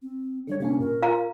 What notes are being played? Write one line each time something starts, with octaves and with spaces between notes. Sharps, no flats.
C4
D3 G3 D4 C#5
C3 A#3 C#4 D4
A#2 A#4
F4 F5 A#5